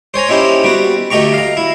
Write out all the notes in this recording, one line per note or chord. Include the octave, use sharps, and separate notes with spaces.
C5 C#5 G#5 A#5
C#4 D#4 E4 G4 C5
G3 B3 F#4
D2 A3 D#4 G4 A#5 C#6
F5 A#5
E4